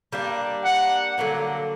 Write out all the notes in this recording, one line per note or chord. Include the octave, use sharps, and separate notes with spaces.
G3 A#3 D4
F#5
D3 F#3 A#3